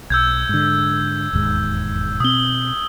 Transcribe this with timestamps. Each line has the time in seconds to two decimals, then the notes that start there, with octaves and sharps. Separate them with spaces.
0.10 B1 E6 G6 G#6
0.49 G#2 D3
1.33 E1 D#2 G#2
2.20 B2 C4 D#6 G7